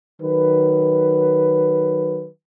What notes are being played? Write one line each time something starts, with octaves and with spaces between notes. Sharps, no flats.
D#3 F#3 B4